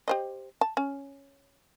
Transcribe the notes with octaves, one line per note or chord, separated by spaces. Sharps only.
G4 C5 D#5
A5
C#4